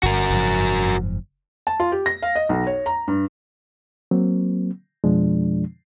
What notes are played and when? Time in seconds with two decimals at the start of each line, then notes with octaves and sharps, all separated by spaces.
0.03 G1 F#4 A#4
0.30 F#1 G#2 F3
1.67 A5
1.80 F4
1.92 G4
2.06 A#6
2.22 F5
2.36 D#5
2.49 B1
2.67 C#5
2.86 A#5
3.08 G2
4.11 F#3 A#3 C4
5.04 F2 B2 F3 G#3 D4